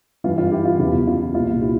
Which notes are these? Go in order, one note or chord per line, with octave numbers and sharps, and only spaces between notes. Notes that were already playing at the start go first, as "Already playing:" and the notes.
G2 E3 F4
F4
E4 G4
F4
E2 C#3 E3 E4
F4
C2 A#2 F4
E4 G4